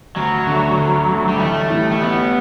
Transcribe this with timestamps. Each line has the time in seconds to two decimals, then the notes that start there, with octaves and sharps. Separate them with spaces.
0.16 D2 F#3
0.47 D3 A3
0.77 D2
1.08 D3 A3
1.29 G3
1.39 A1 A3
1.70 A2 E3 G3
1.92 A3
2.01 A1 B3